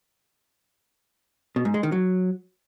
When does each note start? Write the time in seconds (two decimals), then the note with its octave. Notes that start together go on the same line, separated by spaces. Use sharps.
1.56 B2
1.65 G#2
1.74 G#3
1.83 D#3
1.92 F#3